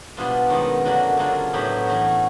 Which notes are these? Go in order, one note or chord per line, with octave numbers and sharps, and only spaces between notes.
B2 G3 B3 D4 F4
F#2 D#3 G#3 B3
D3 F#3 A#3 D4 F#4
C#3 F#3 A#3 D4 F4
A2 F#3 B3 E4 G4
E3 A3 C#4 F#4